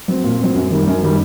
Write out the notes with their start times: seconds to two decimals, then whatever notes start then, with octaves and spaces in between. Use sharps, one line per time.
0.08 F#3 C4
0.24 A#2
0.40 F#3 C4
0.55 F#2
0.71 D#3 G3
0.87 F#2
1.03 D#3 G3